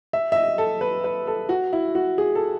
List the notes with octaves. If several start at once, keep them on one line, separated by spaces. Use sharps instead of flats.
E5
E5
D#5
A4
B4
B4
A4
F#4
E4
F#4
G#4
A4